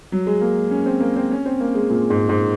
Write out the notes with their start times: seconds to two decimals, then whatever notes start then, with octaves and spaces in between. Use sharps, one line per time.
0.12 F#3
0.27 G#3
0.41 A#3
0.71 C#4
0.86 C4
1.00 A#3
1.16 C4
1.31 C#4
1.46 C4
1.61 A#3
1.75 G#3
1.90 A#2
2.10 G#2
2.29 G#2